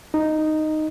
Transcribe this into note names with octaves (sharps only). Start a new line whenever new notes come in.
D#4